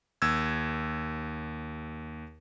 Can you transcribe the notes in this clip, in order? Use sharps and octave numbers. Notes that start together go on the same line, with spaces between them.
D#2 E6 G#6